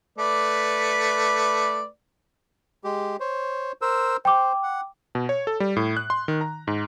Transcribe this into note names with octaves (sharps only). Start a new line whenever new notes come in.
A3 B4 D5
G#3 G4
C5 C#5
A#4 C5 E6
C5 G5 D6
F#5
B2
C#5
A4
G3
A2
F#6
C6
D#3
A#5
G#2